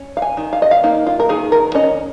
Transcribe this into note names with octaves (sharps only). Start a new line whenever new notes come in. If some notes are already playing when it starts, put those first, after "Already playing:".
Already playing: C#4
F5
G#5
D#3
F5
D#5
F5
A#3 D#4
F4
A#4
D#3 G#4
A#4
C#4 D#5